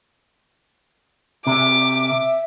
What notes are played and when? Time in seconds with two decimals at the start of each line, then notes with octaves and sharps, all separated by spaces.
1.47 C3 E5 D6